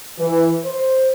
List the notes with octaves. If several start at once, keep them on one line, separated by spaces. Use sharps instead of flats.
E3
C5